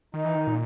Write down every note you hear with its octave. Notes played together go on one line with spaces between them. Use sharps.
D#3 D#4
E3
D#3
A#2